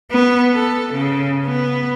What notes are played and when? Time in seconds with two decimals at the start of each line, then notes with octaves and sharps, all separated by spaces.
0.11 B3
0.53 A4
0.93 C#3
1.45 B3